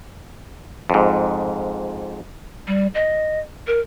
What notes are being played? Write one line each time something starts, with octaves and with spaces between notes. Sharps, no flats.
F2 G#2
G3
D#5
A#4